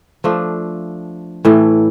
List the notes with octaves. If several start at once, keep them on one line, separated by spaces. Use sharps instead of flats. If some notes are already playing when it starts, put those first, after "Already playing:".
F3 A3 D4
A2 E3 A3